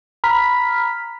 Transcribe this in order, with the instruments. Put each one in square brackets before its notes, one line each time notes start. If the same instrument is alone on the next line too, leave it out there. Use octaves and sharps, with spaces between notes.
[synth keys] A#5 B5 F6 B6